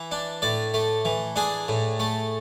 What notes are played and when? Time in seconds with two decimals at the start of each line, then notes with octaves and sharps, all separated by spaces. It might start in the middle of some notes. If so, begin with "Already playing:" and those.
Already playing: E3 E5
0.11 D4
0.42 A2 D5
0.74 A3
1.05 E3
1.36 D4 G#4
1.68 A2
2.00 A3